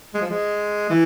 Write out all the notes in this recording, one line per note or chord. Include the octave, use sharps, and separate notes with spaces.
G#3
F3
G#3
E3